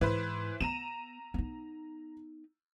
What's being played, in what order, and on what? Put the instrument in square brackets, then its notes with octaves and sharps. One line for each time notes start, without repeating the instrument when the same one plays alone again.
[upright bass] G#2 [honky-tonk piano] E3 B4 C5
[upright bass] B3 [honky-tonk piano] A#5 D#7 E7
[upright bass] B3 D#4